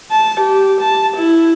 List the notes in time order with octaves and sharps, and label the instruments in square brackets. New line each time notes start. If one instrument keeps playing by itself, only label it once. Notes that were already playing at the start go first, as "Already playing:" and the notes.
[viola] A5
G4
A5
E4